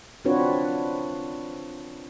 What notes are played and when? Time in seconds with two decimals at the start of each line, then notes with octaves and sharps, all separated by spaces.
0.25 C4 D4 F4 F#4 B4 C#5